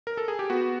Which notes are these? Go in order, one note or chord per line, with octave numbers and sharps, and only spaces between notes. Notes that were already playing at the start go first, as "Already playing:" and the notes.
A#4
A4
G#4
G4
B3 F#4